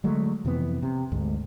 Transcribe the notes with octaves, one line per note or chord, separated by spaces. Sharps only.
D3 F#3 G#3 A3
F2 C3 E3 B3
C3
D2 G#2